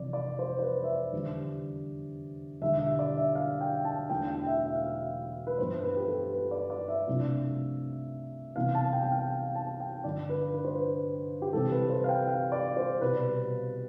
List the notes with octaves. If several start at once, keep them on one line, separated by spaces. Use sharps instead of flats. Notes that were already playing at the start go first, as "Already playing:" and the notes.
Already playing: F1 F2 E3 D5
D5
C5
C5
B4
E5
D5
E2 D3 G3
E1 E2 D3 G3 E5
E5
D5
E5
F5
G5
A5
E1 E2 B2 A3 D4 G5
G5
E5
E5
F5
E5
B4
A1 G2 F3 B3 C5
B4
G4
A4
B4
D5
D5
E5
C2 C3 F3 A3 D4
C2 C3 E3 B3 F5
A5
G5
G5
F5
G5
A5
G5
G2 D3 F3 D5
B4
B4
C5
B4
G4
C2 C3 E3 G3 C4 A4
B4
C5
F5
G5
F5
D5
C5
C2 B2 G3 B4